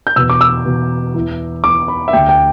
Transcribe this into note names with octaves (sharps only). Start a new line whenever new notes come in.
G6
E2 B2 E6
D6
E6
E2 B2
E2 E3
E2 E3 D6
B5
E5
D2 D3 G5
G5